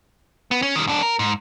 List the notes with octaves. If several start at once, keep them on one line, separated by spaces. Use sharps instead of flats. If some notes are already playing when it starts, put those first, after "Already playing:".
B3
C#4
D#3 G3
F#2 D4
A#4
G#2